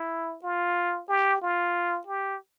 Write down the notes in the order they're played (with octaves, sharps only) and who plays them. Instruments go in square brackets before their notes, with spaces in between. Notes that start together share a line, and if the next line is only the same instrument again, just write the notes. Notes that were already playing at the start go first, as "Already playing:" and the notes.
Already playing: [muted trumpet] E4
F4
G4
F4
G4